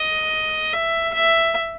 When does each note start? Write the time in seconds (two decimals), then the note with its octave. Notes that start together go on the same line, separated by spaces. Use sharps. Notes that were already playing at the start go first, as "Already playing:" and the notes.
Already playing: D#5
0.73 E5
1.14 E5